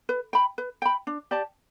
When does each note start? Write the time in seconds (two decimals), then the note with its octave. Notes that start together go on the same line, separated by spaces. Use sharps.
0.09 B4
0.33 G5 B5
0.58 B4
0.82 G5 B5
1.07 D4
1.31 G4 D5 A5